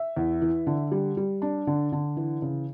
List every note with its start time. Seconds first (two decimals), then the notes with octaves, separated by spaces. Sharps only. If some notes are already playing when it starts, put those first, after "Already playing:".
Already playing: E5
0.17 E2
0.42 E3
0.67 D3
0.92 G3
1.17 G3
1.42 D4
1.67 D3
1.92 D3
2.17 E3
2.42 C#3